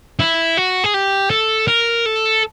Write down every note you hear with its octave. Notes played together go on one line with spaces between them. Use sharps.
E4
F#4
G#4
G4
A4
A#4
A4